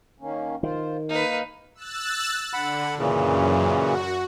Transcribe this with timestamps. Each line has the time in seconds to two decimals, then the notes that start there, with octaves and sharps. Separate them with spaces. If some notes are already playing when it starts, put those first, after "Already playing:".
0.20 D#3 A#3 C#4
0.63 D#3 F4 C5
1.10 A#3 D#4 B4 F5
1.75 E6 F#6 A6
2.53 D3 F#5 B5
2.99 F#2 A#2 C#3 E3
3.74 F#4